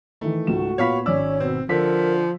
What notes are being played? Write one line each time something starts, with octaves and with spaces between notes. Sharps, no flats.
D#3 E3 A3
C#2 G#2 F#4 E7
A#2 B3 C#5 F5 B5 B6
G#1 C#4 C#5 D5 E6
B2 C4
D3 F3 A#4 B6